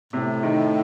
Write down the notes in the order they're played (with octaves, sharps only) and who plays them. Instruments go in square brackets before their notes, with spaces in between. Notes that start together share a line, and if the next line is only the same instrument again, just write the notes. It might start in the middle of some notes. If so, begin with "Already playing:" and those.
[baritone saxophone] A2 [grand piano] C3
[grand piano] D#3